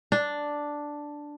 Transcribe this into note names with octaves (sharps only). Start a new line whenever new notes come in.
D4